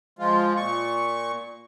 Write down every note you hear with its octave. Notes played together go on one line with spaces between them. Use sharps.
F3 G#3 F4
A#2 C#6